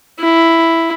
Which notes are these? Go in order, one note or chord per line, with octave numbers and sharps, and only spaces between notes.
E4